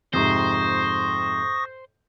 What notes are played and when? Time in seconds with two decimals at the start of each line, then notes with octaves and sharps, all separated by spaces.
0.13 F2 G#2 C3 C5 C#6 D#6 A#6